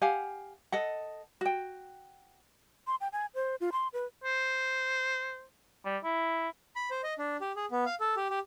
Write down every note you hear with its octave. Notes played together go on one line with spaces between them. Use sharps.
G4 F5 F#5 G#5
A4 D#5 F#5
F#4 G5
C6
G5
G#5
C5
F4
C6
B4
C5
G3
E4
B5
C5
D#5
D4
G4
G#4
B3
F5
A4
G4
G4